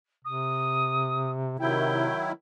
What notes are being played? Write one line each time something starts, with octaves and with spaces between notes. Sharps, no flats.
C3 D#6
C3 D#3 F#3 E4 G5